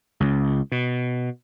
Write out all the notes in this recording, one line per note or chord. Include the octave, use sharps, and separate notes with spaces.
C#2
B2